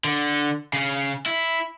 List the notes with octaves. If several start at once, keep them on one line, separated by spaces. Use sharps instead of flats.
D3
C#3
E4